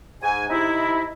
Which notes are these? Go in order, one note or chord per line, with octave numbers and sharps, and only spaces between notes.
G#2 G#5
C3 D#4 E4